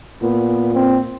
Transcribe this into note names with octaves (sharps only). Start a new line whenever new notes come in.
A#2 B3
C4